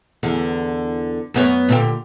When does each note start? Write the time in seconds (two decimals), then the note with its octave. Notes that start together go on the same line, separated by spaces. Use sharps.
0.23 E2 D3
1.34 F#2 B3 C#5
1.69 A#2 D3 G4